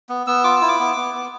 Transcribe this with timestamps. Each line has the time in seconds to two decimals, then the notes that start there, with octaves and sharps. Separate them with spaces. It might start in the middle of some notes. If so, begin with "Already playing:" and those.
0.09 B3
0.27 B3 E6
0.44 F4 D6
0.56 E6
0.62 E4
0.68 D6
0.80 B3
0.97 B3
1.14 B3